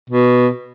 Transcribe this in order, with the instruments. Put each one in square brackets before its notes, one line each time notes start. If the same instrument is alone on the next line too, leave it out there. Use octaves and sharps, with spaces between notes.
[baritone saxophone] B2